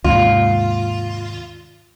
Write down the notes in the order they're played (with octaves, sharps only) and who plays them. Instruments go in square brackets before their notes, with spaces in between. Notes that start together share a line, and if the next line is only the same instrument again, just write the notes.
[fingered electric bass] D#2 G#2 C3 [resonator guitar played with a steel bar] F4